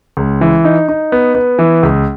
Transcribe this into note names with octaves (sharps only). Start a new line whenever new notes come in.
C#2
E3
D#4
D#4
B3
B3
E3
C#2